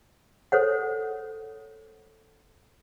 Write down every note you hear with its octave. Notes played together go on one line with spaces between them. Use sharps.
A4 C5 C#5 F#5